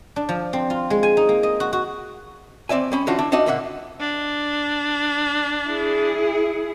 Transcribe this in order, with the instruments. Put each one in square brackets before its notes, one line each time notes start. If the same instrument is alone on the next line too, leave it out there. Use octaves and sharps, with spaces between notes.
[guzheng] D4
F3
C4
F4
G#3
G#5
D#4
A#3
D#5
F#4
F#4
[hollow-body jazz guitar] D#2 C4 D5 E5 G#5
G3 C#4 B5
E3 C#4 D4 F4 F#4
D4 E4
D4 D#4 F#4 D#5 E5
C#2 A#2 A#3 E5 F#5
[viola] D4
[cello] E4 G#4